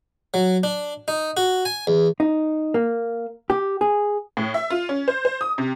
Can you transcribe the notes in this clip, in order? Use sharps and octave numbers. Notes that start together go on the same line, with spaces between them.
F#3
D4
D#4
F#4
G#5
E2
D#4
A#3
G4
G#4
A2
E5
F4
C#4
C5
C5
D#6
C3